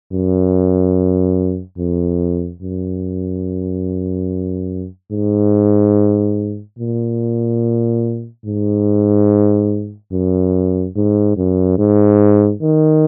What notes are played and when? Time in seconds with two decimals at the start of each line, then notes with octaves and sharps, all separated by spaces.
0.12 F#2
1.78 F2
2.62 F#2
5.11 G#2
6.79 A#2
8.45 G#2
10.12 F#2
10.96 G#2
11.37 F#2
11.78 G#2
12.62 D#3